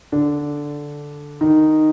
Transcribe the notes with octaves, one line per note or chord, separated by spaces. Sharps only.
D3 D4
D#3 D#4